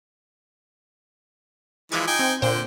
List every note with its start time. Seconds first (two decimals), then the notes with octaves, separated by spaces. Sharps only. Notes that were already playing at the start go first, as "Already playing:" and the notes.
1.92 E3 F3 G#3 F4 D6 G#6
2.07 D#4 G5 G#5
2.19 C4
2.42 A#2 D3 C5 G5